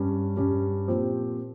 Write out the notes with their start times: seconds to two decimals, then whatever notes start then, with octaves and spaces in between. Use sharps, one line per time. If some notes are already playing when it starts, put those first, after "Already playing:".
Already playing: G2 G3 C#4
0.36 G2 G3 C#4
0.88 A#2 F3 C4 G4